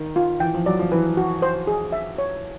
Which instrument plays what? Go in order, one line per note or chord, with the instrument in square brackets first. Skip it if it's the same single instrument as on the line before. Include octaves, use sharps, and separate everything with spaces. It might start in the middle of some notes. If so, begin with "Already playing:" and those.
Already playing: [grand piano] D#3 [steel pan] A#4
[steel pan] F4
[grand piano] E3 [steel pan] G5
[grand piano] F3
[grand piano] F#3 [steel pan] D5
[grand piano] F3
[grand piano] E3 [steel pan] B4
[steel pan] F#4
C5
G#4
E5
C#5